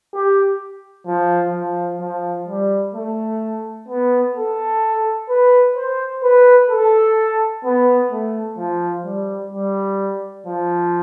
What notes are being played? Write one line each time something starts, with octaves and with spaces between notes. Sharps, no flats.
G4
F3
F3
F3
G3
A3
B3
A4
B4
C5
B4
A4
B3
A3
F3
G3
G3
F3